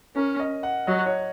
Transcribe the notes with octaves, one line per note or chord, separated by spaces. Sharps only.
C#4 A#4
D#5
F#5
F#3 D#5
C#5